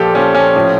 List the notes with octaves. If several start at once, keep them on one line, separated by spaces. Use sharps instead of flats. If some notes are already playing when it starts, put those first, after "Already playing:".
Already playing: A#2 F3 G4 A4
A#2 F3 C#4
C#4
A2 F3